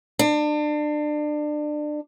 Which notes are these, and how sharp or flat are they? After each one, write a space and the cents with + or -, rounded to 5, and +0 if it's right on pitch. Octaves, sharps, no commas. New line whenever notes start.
D4 +30